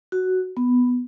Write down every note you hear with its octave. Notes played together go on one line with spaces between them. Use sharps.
F#4
B3